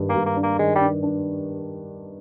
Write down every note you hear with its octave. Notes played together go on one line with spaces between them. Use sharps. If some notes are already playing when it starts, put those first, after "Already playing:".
Already playing: G2 D#3 D4
A#3
G2
A#3
D4
A#3
D#3 G#3
G3
D4
D4